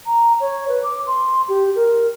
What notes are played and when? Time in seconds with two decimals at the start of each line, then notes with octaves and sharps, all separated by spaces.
0.07 A#5
0.40 C#5
0.68 B4
0.83 D6
1.07 C6
1.49 G4
1.76 A#4